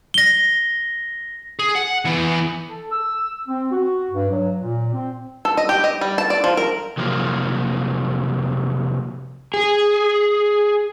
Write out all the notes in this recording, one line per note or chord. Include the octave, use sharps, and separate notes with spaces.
A#6 G7
G#4
F#5
E3 B3
A4
E6
C4
F#4
G2
F#3
A#2
C4
A4
D#5
G4
D#5
G3
A5
D5
F3
A#4
C3 F3 F#3 A#3
G#4